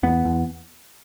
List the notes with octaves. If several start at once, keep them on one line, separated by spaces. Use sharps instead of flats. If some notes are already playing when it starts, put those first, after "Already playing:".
E2 B3
E2